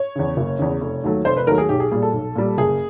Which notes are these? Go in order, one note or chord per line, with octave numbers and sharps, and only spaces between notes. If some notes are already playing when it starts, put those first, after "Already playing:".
Already playing: C#5
E2 C#3
F#1
E2 C#3
F1
D#2 D#3 F#3 A3
F1 C5
B4
D#2 D#3 F#3 A3 A#4
G#4
B1 G4
G#4
A#2 G3 G#4
A4
B1
A#2 G3
F#1 G#4